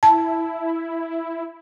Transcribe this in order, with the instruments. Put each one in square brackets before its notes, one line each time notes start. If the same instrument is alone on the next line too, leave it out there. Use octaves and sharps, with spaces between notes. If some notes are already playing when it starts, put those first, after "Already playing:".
[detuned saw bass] E4 [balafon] A5